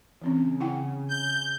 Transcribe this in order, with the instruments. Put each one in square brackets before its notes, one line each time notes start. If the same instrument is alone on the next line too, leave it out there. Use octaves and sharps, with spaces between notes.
[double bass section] C#3 [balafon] E3 C4 C#4
[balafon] E4 F#5 G5
[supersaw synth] G6